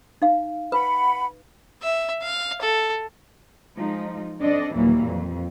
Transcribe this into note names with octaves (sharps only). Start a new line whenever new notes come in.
D#4 F5
B4 F#5 B5
E5
F5
A4
F3 G#3 D#4
C4 D4 A4 D5 D#5
D#2 A#2 E3 F#3 G3 A#3
F2